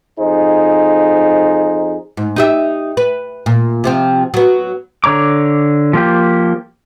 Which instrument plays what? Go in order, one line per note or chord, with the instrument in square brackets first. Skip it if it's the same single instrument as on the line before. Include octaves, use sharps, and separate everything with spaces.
[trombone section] F2 D#4 G#4 C5
[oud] G#2
D#4 G4 E5
B4
A#2
C3 F3 C4
F#3 B3
[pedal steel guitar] D3 C#5 A#5 D6
F3 A#3 G4